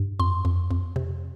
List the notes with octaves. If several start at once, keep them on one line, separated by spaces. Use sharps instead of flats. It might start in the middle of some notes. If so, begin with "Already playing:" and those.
Already playing: G2
F2 C6
F2
F2
C3